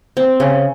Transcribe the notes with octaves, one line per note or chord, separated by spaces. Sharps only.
C4
C#3